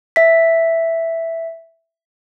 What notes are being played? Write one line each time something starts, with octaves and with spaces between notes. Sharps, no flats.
E5 B6